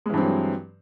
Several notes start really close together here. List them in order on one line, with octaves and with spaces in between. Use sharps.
G#3 E3 G2 C4 F#3